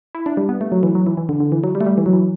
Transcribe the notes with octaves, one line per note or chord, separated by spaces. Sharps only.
E4
D4
G3
B3
A3
F#3
E3
F#3
E3
E3
D3
D3
E3
F#3
G3
A3
G3
E3
F#3
E3